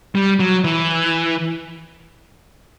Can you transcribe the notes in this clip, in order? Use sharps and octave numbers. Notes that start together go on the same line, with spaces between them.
G3
F#3
E3